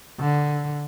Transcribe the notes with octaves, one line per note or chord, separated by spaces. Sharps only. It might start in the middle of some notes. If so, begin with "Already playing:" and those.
D3